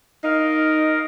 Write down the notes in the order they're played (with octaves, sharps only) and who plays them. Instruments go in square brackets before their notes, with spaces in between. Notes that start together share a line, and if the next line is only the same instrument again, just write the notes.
[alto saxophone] D#4 [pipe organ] A#4 D#5 F5